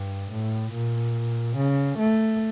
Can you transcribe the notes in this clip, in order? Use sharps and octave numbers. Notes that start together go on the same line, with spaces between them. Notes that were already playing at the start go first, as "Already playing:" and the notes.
Already playing: G2
A2
A#2
C#3
A3